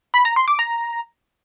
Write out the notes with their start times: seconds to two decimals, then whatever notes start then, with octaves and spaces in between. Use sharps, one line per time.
0.14 B5
0.25 A#5
0.36 C6
0.48 D6
0.59 A#5